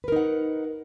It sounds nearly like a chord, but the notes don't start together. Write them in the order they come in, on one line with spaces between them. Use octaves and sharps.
B4 A#4 D#4 F#5